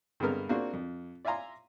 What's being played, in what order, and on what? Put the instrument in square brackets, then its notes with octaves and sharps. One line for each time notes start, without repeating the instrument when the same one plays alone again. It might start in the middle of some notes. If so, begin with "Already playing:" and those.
[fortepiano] G2 D3 G#3 B3 A#4 F6
A#3 C4 D4 F4 F#4 G#4
F2
D5 E5 F5 G#5 A#5 C6